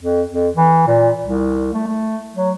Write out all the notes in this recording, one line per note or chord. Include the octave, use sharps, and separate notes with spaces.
F2
F2
E3
A#2
C2
A3
A3
F#3